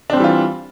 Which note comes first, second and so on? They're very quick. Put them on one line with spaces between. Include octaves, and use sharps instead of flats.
D4 C4 G3 E3 F4